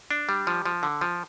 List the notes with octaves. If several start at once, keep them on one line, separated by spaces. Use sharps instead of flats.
D4
G3
F3
F3
D3
F3